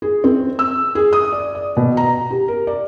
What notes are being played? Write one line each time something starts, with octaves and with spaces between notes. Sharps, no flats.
G#4
C4
E6
G#4
D#6
D5
D5
B2
A#5
G4
A#4
D5